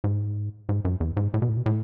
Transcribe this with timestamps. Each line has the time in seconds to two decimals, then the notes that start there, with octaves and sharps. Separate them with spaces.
0.04 G#2
0.69 G#2
0.85 F#2
1.00 E2
1.17 G#2
1.34 A2
1.42 B2
1.49 A2
1.57 B2
1.66 A2